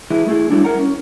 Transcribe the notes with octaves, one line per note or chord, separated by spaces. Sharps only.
E3 G#3 E4
A3 E4 G#4
F#3 G3 A3 D4 E4
A#4 C5 F#5 A#5
C#4